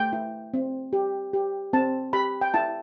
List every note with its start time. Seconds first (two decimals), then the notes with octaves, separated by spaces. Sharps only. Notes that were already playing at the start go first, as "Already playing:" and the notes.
Already playing: A3 G5
0.13 E4
0.54 C4
0.93 G4
1.33 G4
1.73 C4 A5
2.13 G4 B5
2.41 G5
2.54 E4 A5